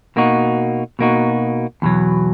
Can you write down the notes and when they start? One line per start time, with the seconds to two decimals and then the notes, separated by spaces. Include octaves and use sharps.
0.16 B2 A#3 D#4 F#4
0.99 B2 A#3 D#4 F#4
1.82 E2 B2 F#3